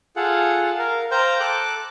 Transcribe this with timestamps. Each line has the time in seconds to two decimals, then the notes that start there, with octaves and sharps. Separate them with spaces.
0.16 F4 G#4 A4 F#5
0.79 A#4 F5
1.11 C5 F5 G5 A#5
1.40 A4 D6 F#6